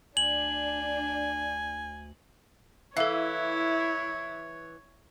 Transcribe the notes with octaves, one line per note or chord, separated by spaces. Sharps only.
D2 D4 G#5 F#7
E3 E4 A4 C#5 F5